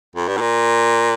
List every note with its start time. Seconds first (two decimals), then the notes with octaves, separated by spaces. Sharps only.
0.16 F2
0.28 G2
0.37 A2
0.41 A#2